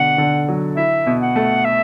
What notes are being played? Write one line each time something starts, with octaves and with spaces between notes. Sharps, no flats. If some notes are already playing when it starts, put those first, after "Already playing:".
Already playing: B2 D3 F#5
D3
F#3
E4 E5
B2
F#5
A3
E5